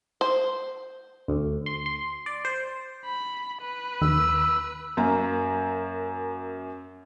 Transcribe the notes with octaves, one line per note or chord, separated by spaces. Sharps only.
C5
D2
C6
C6
D5
C5
B5
B4
D#2 E6
F#2 A#3 A#5